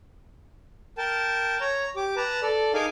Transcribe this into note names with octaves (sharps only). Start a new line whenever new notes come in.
A#4 G5 A5
C#5 A#5
G4 D6
B4 A5 A#5
A4 D5
D#4 G#4 A#4 F5 G#5 D6